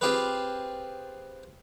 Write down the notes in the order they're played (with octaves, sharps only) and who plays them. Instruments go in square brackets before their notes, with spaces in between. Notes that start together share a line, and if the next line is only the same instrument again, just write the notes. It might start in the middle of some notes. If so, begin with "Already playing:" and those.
[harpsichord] C4 F4 G4 G#4 B4